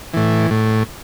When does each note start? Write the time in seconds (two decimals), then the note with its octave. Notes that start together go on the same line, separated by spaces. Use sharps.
0.14 A2 E3
0.51 A2